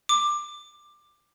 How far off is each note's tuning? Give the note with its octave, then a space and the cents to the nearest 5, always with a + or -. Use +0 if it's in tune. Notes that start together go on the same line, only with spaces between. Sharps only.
D6 +15